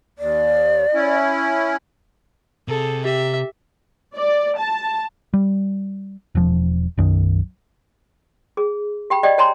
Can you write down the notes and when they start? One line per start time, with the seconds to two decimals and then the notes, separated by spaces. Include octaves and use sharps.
0.19 D#2 D5
0.94 C#4 E4
2.68 C3 G#4 A4
3.05 G4 E5
4.16 D5
4.57 A5
5.34 G3
6.35 E1 F3
6.98 B1 F#2 D#3
8.57 G#4
9.10 G4 G5 B5
9.23 G4 D5 D#5 G5
9.38 C#5 G#5 A#5 C6